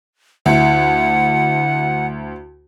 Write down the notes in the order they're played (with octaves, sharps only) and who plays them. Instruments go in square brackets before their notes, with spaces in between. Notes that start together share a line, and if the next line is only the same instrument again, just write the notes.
[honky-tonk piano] D2 E4 [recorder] F#5